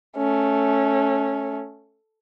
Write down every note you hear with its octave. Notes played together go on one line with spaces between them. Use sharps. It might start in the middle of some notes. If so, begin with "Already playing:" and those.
A3 C#4